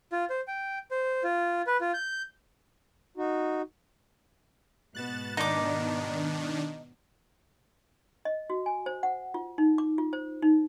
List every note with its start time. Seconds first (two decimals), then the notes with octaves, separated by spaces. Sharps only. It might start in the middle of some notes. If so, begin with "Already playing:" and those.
0.12 F4
0.30 C5
0.48 G5
0.91 C5
1.24 F4
1.67 B4
1.81 F4
1.94 G6
3.17 D#4 F#4
4.95 G#2 B2 B3 F#6 A6 E7
5.37 D#3 D4 D#4 D6
8.25 D#5
8.50 F#4
8.66 G#5
8.86 C5
9.03 F#5
9.34 F4
9.58 D#4
9.78 D6
9.98 F4
10.13 C5
10.42 D#4